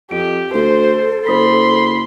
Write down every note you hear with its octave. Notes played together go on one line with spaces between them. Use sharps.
F2 G4 D7
D2 A4 C5
F#1 C5 B5 C6 D#6 B6